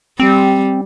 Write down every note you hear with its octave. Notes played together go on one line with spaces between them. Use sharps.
G3 C4